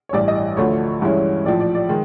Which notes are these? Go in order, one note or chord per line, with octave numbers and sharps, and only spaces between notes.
C#5
A1 G2 E3 D5
D#5
D5
D2 D3 F3 A3 C#5
G2 E3 G#3 C#4 E4
A#1 A2 F3 D5
D5
D5
D#3 G#3